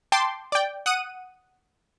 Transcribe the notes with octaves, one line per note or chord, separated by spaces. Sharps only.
G5 A5 C6 D6
D5 G5
F#5 D#6 D#7